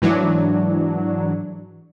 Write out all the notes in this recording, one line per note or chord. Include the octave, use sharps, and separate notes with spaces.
G#2 E3 F#3 D4